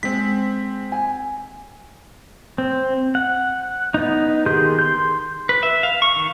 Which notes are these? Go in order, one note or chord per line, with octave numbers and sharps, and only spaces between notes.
G#3 C4 B6
G#5
C4
F#5
B3 D#4
D#3 G4 G#4 C6 G6
C6 G6
B4
E5
F5
C#6
D#3